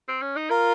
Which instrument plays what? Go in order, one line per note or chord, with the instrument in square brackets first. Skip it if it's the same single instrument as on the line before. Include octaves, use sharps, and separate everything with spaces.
[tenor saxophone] C4
C#4
D#4
[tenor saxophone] F4 [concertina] A#4